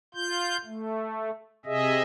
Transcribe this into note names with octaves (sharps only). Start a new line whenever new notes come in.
F4 G6
A3
C3 G#4 D#5 E5